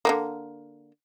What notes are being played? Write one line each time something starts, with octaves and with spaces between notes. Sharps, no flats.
D3 F#3 A#3